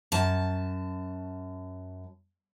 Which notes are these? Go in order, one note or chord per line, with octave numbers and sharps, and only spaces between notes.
F#2 A5